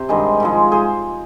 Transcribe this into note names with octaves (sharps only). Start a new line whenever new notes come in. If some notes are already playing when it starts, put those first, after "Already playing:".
Already playing: C3 C5
G2 D#3 G#3
G#2 F3 G#3
G#4 C5